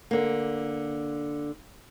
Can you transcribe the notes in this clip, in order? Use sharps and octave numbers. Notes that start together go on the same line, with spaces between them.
D3 A#3